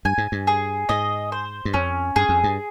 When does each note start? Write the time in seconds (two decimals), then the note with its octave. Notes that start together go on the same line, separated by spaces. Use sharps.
0.05 G2 G#5
0.18 G#2
0.32 G2
0.47 G#4
0.89 G#2 D#5
1.32 C5
1.65 G2
1.74 F2 C#4
2.16 G2 G#4
2.29 F2
2.44 G2